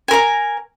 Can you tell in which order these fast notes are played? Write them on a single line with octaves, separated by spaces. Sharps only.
G#5 A#4 A#5